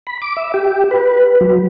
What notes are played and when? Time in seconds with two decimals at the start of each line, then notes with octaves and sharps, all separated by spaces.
0.07 B5
0.22 D6
0.37 E5
0.54 G4
0.91 B4
1.41 F#3